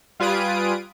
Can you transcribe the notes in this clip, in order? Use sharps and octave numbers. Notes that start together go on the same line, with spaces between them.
G3 F4 B4 G#5 D#6 D7